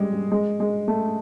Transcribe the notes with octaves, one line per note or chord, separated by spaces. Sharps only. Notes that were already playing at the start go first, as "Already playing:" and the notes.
Already playing: G3 G#3
G3
G#3
G#3
A3